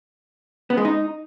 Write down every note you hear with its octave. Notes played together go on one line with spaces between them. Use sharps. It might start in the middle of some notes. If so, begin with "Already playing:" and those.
B3
G#3
D#4